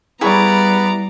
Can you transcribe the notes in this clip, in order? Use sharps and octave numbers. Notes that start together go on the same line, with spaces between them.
G3 B3 E4 G#4 D5 A#5 C#6